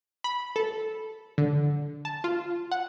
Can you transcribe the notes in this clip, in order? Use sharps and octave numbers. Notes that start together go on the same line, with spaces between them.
B5
A4
D3
A5
F4
F#5